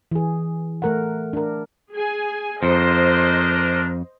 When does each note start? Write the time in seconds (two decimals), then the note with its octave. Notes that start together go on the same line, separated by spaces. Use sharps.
0.11 E3 G#4
0.82 A3 A#4 F#5
1.33 D4 A#4
1.94 G#4 G#5
2.63 F2 D4 A#4 C5 D#5